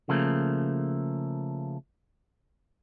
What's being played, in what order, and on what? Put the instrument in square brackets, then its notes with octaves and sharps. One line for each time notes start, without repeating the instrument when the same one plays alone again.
[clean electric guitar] C#3 F3 A3 A#3